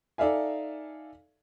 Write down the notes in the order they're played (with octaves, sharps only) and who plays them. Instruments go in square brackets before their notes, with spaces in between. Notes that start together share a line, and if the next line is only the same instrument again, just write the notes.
[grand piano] D#4 A4 D5 E5 F5 G#5